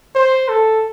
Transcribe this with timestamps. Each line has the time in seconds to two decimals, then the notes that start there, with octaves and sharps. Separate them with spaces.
0.15 C5
0.49 A4